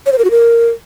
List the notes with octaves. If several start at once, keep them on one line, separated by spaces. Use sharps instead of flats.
C#5
C5
A#4
F#4
A#4